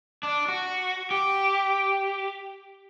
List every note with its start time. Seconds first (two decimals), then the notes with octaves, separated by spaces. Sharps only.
0.23 D4
0.48 F#4
1.11 G4